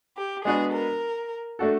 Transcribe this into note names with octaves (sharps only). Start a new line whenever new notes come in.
G4
G#3 B3 D4 F#4 G#4 B4
A#4
A3 D4 F#4 A4